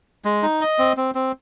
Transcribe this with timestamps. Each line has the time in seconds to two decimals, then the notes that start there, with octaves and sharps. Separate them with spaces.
0.25 G#3
0.43 D#4
0.61 D#5
0.79 C4
0.97 C4
1.15 C4